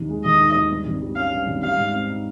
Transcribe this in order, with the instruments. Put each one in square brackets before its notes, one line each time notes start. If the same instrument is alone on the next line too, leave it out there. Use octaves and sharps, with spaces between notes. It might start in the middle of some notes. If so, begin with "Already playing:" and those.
Already playing: [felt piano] D#2 D#3
G#3
[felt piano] D#2 [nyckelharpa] D#5
[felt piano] D#3
D#2
G2
G#1
G3
[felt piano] C#4 [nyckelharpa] F5
[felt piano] G2
G#1
[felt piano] G3 [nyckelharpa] F5
[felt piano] G#2
C4
D#4